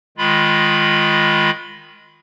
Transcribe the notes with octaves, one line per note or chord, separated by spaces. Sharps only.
D#3 G#3 F4 B5